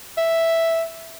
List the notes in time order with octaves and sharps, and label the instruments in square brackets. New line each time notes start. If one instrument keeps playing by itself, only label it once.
[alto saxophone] E5